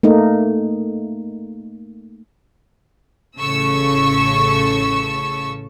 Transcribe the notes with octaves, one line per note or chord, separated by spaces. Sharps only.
A3 A#3 D#4
A1 C#3 A4 C#6 E6